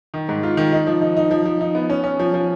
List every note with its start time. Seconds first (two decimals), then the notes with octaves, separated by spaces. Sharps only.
0.14 D#3
0.29 G#2
0.43 F4
0.57 D#3
0.72 D#4
0.87 F3
1.01 D#4
1.17 D#4
1.31 F3
1.45 F3
1.61 D#4
1.75 B3
1.90 C#4
2.04 C#4
2.19 F3
2.34 F3